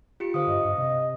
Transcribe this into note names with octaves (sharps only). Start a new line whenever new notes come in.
F4 G4 C#7
D3 C5 F5 D#6
G2 D#5
G2
C3 D#5